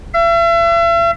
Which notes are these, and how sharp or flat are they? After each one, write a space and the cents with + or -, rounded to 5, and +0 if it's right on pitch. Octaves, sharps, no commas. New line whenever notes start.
E5 +40